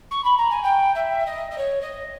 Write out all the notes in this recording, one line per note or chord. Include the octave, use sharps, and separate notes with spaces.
C#6
B5
A#5
G#5
G5
E5
D#5
D#5
C#5
D#5